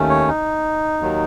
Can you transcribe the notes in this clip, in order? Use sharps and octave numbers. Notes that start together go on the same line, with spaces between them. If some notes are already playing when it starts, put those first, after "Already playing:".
Already playing: D#2 D#3 A3 C#4
C#5
D#4
D#2 D#3 F#3